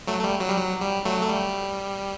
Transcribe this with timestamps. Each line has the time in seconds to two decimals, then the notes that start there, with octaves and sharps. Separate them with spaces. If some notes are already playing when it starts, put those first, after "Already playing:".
0.07 F#3 A3
0.19 A3
0.24 G3
0.40 F#3
0.48 G3
0.57 F#3
0.81 G3
1.05 F#3 A3
1.23 A3
1.29 G3